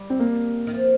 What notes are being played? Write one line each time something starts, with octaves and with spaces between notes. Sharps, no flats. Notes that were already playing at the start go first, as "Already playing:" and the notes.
Already playing: G3
C4
A#3
D#3
F3